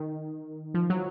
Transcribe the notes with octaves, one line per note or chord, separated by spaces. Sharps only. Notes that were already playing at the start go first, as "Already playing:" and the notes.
Already playing: D#3
F3
F#3